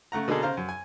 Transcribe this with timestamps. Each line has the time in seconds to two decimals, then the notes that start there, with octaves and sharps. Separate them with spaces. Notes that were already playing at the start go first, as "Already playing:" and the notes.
0.12 C#3 A3 F#5 A#5
0.28 B2 D3 A#3 D#4 G#4 A4
0.42 C#3 C5 F5 A#5
0.57 F#2
0.69 G#5